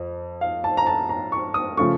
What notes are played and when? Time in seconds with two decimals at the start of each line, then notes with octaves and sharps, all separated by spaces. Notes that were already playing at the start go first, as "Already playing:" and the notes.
Already playing: F2
0.41 F5
0.64 A5
0.77 A#5
0.87 A5
1.09 A#5
1.32 C#6
1.54 D#6
1.77 C#3 F3 A3 C#6